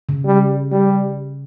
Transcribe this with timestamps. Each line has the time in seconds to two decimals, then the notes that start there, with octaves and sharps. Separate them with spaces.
0.09 C#3
0.25 G3
0.72 G3